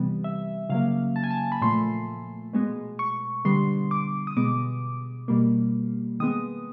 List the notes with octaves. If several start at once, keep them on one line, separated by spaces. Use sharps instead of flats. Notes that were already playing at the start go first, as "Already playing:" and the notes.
Already playing: C3 E3 G3 B3
E5
C#3 F#3 A#3 F5
A5
G#5
A5
B5
A#2 F3 A3 C6
B2 G#3 B3
C#6
D3 G3 B3 C6
D6
D#6
B2 G#3 B3 D6
B2 G3 A#3
D#3 G#3 B3 D#6